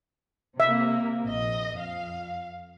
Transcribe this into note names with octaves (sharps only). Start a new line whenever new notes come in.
C3 A#3 E5
A#1 D#5
F2 F5